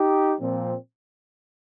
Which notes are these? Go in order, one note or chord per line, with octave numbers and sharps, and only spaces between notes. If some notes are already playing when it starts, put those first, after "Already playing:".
Already playing: D#4 G4
A#2 F3 C4